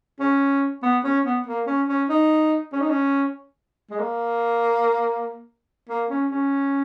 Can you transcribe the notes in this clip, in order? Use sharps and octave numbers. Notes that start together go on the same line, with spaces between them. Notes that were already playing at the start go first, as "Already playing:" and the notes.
C#4
B3
C#4
B3
A#3
C#4
C#4
D#4
C#4
D#4
C#4
G#3
A#3
A#3
C#4
C#4